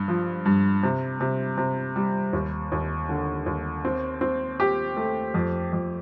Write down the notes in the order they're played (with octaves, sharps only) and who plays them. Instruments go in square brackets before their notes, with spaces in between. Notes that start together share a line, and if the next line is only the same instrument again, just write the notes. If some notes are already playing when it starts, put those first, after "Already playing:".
Already playing: [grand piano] G2
F3
G2
C3
C3
C3
G3
D#2
D#2
D3
D#2
C4
C4
G4
A3
F2
F2